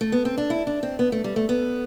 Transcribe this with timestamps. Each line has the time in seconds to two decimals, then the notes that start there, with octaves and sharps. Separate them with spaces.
0.01 A3
0.12 B3
0.25 C4
0.38 D4
0.50 E4
0.67 D4
0.83 C4
0.99 B3
1.12 A3
1.24 G3
1.36 A3
1.49 B3